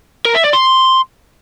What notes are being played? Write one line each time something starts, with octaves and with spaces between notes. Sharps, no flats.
A#4
E5
D5
C6